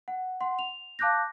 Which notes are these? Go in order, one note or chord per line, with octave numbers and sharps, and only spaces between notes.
F#5
F#5 C6
F7
F5 A5 D6 F#6 G6 A#6